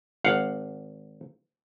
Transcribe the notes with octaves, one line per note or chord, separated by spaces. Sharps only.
G#1 F5 F#5